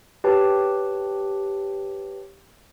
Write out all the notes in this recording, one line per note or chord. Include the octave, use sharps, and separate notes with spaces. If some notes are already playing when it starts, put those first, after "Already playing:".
G4 B4 C#5 G5 A5